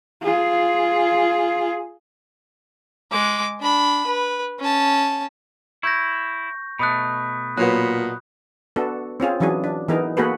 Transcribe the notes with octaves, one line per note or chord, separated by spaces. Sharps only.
F4 G#4
G#3 D6
D4 B5
B4
C#4 A5
E4 C#6 G6 A#6
B2 A3 B5 D#6 F#6
A#2 F#3 B3 F#6
B3 D4 F#4 A4
C4 C#4 F4 G#4
E3 F#3 C#4 D4 G#4
D4
E3 B3 D#4 G#4 A#4
A#3 B3 F#4 G#4 A4 B4